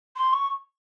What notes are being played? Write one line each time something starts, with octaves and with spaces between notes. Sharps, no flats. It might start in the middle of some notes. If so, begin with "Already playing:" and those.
C6
C#6